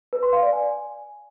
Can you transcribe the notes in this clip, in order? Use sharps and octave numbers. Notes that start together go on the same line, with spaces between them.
B4
C6
F5
D5
G#5